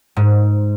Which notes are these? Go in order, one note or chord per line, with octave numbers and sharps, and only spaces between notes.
G#2